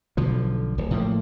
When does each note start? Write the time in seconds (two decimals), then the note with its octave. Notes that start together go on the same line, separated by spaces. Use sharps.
0.17 B1 D3 F3
0.78 D1
0.91 A2 F3 A#3